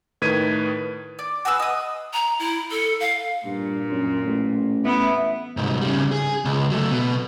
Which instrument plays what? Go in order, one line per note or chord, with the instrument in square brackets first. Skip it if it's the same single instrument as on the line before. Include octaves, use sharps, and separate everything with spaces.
[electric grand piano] A2 D#3 B4 G#6 B6 D#7
[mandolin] D5
F#4 G#4 B4 E6
D#5 D#6
[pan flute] A#5
E4
A4
F5
[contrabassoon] G2 [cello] A#2
[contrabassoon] F#2
A1
[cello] B3 E4
[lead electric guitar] C2 G#2
C#3 G3
G#4
C#2
F#3 A3
B2